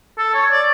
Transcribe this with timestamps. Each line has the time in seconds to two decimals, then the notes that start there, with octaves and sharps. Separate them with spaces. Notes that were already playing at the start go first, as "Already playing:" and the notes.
0.18 A4
0.34 C#5
0.51 D5